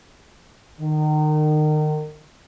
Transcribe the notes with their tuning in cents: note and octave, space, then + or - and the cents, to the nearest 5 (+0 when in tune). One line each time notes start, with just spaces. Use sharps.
D#3 -30